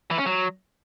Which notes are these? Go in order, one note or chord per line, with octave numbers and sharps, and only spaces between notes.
E3
C#4
F#3